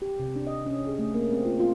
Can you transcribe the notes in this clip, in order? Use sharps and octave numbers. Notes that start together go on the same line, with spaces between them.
G4
C3
D4
D#5
C#4
G#4
A3
A#3
C4
F4
F4